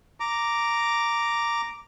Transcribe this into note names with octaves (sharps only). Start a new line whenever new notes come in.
A#5 D6